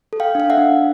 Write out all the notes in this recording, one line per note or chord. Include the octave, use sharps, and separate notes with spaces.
A4
F5 G5
D4 F5
E5 F#5
D4